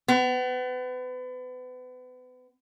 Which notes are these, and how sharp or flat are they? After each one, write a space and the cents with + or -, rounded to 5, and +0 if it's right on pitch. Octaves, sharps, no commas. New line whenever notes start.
B3 +35